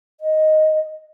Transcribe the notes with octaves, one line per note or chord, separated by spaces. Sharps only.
D#5